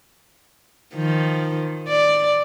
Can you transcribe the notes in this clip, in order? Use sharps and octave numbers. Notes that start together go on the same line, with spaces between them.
D#3 F3
D5